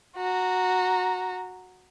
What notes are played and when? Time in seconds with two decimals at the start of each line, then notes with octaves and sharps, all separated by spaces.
0.17 F#4 A#5